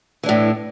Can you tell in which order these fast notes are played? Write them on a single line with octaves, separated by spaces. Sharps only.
E3 D4 A2